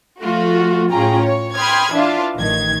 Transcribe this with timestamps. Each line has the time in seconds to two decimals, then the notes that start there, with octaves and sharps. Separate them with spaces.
0.20 F3 A3 F4 F#4
0.91 A2 C#4 F4 G#4 G5 A#5
1.21 C#5
1.55 G5 B5 C6 D#6 F6 G#6
1.93 E3 D4 F4 E5 F5
2.35 A1 D#3 G#6